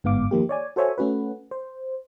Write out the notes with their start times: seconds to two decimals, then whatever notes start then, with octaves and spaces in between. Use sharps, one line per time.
0.04 G1 G#2 B3 F5 D6
0.31 D#3 F3 A#3 G4
0.49 C#5 D5 G#5
0.76 F#4 A4 C5 C#5 E5 G#5
0.98 A3 C#4 F#4 B4
1.51 C5